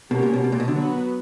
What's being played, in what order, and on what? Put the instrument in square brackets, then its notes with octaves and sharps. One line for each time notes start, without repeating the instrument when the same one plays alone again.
[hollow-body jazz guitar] B2 [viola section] C#4 G4 A#4
[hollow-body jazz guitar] A#2
B2
B2
A#2
B2
D3
[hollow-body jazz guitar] F#3 [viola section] B3 F#4 B4